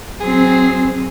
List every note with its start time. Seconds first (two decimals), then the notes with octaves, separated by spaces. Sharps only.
0.20 F#3 C4 G#4